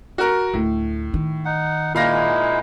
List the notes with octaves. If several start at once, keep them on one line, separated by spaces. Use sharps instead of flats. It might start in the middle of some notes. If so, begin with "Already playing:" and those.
F#4 A#4
D2 A2
D#3
D#4 F#5
A#2 G#3 D#4 E4 F5 A#6